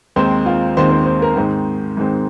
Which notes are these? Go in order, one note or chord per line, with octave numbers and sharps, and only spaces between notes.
D#2 D#3 G#3 C4 C5
F4
D#2 D#3 G#3 C4 C5
C5
C5
A#4
G#2 D#3 G#3 C4
G#2 D#3 G#3 C4